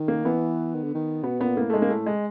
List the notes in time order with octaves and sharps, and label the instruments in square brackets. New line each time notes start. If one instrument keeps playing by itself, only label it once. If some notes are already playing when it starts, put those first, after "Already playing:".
Already playing: [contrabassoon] D#3
[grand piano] A#3
[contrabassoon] E3 [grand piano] B3
[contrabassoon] D#3
D3
D#3
[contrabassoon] B2 [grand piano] B3
[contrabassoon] A#2 [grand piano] B3
[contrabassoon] A2 [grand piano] A#3
[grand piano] A3
[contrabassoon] G#2 [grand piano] G#3
[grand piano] A#3
[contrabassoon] A2 [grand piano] A3
[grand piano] G#3